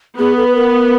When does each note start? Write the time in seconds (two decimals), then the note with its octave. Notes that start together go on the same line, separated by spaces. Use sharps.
0.19 B3 G#4
0.37 A4
0.47 B4
0.56 A#4